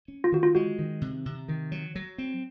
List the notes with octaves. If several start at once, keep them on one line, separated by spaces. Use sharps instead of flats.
C#4
F4
D#3 F#4
F4
G#3 F#4
D#3
C3
C3
D#3
F#3
F#3
C4